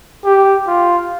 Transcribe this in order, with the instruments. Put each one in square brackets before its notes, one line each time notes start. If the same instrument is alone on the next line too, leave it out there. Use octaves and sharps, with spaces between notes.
[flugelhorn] G4
F4